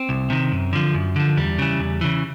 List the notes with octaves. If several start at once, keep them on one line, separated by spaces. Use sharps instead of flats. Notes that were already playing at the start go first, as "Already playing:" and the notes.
Already playing: C4
C2
C3 D#3
F#2
D3 F3
F#2
D3 F3
E2 G3
C#3 E3
E2
C#3 E3